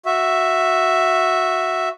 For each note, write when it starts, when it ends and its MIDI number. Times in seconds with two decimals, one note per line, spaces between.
0.06 1.89 66
0.06 1.89 76